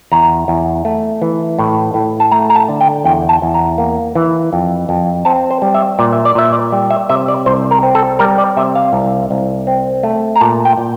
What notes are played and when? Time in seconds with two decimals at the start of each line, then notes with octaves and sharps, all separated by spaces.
0.12 E2 A#5
0.48 E2
0.85 A3
1.22 E3
1.59 A2
1.94 A2
2.20 A5
2.31 A3 A#5
2.50 A#5
2.56 A5
2.69 D3
2.81 G5
3.05 E2 G5
3.29 A5
3.42 E2
3.54 A#5
3.78 A#3
4.15 E3
4.53 F2
4.89 F2
5.25 C4 A5
5.51 C5
5.62 G3
5.74 E5
5.99 A#2 D5
6.13 E5
6.25 D5
6.35 A#2 E5
6.52 D5
6.72 G3
6.90 E5
7.09 C3 E5
7.28 D5
7.46 C2 C5
7.71 A#4
7.83 C4
7.95 A4
8.19 G3 A#4
8.38 D5
8.57 C3 E5
8.76 F5
8.93 C2
9.31 C2
9.67 C4
10.03 A3
10.36 A#5
10.41 A#2 A5
10.65 G5
10.78 A#2